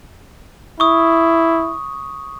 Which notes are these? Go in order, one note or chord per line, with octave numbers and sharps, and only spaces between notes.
E4 C#6 D#6